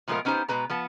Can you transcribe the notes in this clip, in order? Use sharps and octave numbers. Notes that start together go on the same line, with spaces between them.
A#2 F3 G#3 A3 B3 A#4
B3 C#4 D#4 G4 C5
B2 G#3 B4 A#5
F3 B3 A5